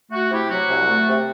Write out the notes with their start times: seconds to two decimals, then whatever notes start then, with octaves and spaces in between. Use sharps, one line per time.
0.11 A3 F#4
0.31 C3 E4 G4
0.50 F#3 F#4
0.69 C2
0.88 A3
1.07 C3